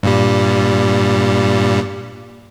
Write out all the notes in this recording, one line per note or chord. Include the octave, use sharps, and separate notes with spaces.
G2 A#2 G3